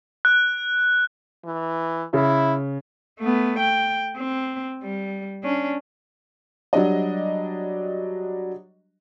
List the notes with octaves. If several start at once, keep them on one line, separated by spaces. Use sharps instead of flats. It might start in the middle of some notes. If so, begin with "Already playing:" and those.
F#6
E3
C#3 E4
A3 B3
G5
C4
G3
C#4 D4
F#3 G3 D4 D#5